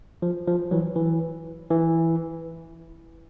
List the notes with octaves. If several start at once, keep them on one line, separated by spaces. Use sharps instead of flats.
F3
F3
E3 F#3
E3
E3